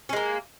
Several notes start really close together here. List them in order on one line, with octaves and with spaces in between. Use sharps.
C#4 G#3 A#3